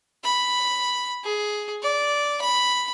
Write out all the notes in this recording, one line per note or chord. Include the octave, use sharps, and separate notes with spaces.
B5
G#4
D5
B5